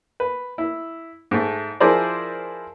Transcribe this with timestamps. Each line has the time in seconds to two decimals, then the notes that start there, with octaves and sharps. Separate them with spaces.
0.20 B4
0.58 E4
1.31 G#2 A3
1.80 F3 E4 G#4 A#4 C5 D5